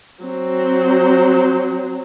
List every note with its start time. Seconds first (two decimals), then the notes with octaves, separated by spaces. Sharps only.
0.24 F#3 C4